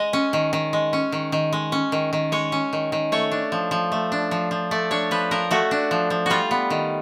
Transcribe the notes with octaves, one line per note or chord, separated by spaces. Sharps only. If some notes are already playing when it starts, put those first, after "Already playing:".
Already playing: G#3 D#5
C#4
D#3
D#3
G#3
C#4
D#3
D#3
G#3
C#4
D#3
D#3
G#3 C#5
C#4
D#3
D#3
A3 C#5
D4
F3
F3
A3
D4
F3
F3
A3 D5
D4 C#5
F3 B4
F3 A#4
A3 F#4
D4
F3
F3
G3 F4 F#4
B3
D#3